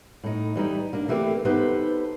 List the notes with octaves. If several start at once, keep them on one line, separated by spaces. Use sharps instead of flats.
A2 D#4
E3 G3 D#4
A#3 D4
E3 A3 A#3 C4 G4
B3 D#4 G4 A4 B4 C5